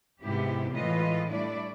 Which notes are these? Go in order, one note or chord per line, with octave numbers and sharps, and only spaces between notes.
G#2 C3 B3 E4 G4
A2 E3 G#3 F4 B4 D#5
G3 A3 D4 E4 D5